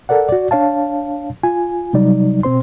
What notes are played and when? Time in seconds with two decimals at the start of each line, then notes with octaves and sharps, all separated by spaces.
0.09 A4 A#4 D5 F#5
0.29 F#4 D5
0.51 D4 C#5 F5 A5
1.43 F4 G#5
1.93 C3 F#3 G3 D#4 D5
2.43 B2 C4 C5 C6